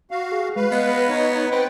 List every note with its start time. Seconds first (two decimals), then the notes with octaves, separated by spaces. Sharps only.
0.11 F#4 F5
0.32 G#4
0.56 G#3 B4 F5
0.72 B3 D#5
1.09 D#4 C#5
1.51 C4 B4 G5